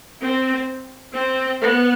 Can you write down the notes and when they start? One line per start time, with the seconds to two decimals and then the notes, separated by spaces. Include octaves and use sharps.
0.22 C4
1.13 C4
1.59 B3